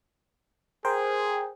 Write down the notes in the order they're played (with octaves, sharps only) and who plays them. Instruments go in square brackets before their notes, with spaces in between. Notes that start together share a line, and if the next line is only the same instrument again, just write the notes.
[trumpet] G#4 [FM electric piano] A#4 C5 G5